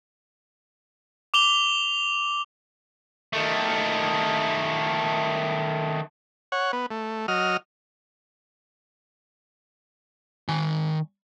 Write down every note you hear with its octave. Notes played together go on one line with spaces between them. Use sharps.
D6 F7 G7
D#3 A3
C#5 F#5
B3
A3
F#3 D#5 F6
D#3 G#5